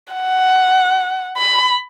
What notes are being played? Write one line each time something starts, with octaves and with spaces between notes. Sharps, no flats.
F#5
B5